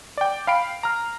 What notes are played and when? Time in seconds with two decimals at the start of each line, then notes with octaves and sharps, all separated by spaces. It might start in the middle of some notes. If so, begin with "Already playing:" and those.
0.17 D5 G5
0.47 F5 G5 B5 C7 D7
0.83 A#5 F6